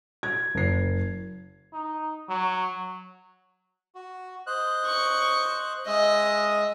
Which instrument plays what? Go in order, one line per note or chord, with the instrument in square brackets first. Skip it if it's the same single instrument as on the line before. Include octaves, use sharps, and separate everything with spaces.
[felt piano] G#6
F#1 C7
[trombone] D#4
F#3
[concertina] F#4
C5 D#5 F#6
[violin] C#6
[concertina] G#3 E5 [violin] D#5